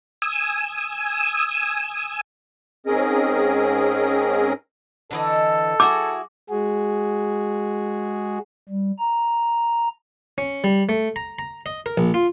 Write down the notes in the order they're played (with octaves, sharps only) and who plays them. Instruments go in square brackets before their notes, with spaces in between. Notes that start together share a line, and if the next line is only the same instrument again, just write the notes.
[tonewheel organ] G#5 D#6 E6
[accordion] G#2 C4 C#4 G#4 A#4 D#5
[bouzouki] D3 E3 D#5 [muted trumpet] A4
[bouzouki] E4 F#4 G#4 [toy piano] D6
[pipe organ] G#3 F#4 G#4
G3
A#5
[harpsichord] C#4
G3
A3
A#5
A#5
D#5
A#4
A#1
F4